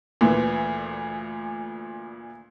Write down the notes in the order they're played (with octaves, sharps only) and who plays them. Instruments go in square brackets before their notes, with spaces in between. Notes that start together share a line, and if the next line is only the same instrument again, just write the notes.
[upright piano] D2 A#2 E3